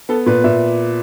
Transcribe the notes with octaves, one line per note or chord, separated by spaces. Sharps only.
B3 A4
A#2 B4
A#2 E5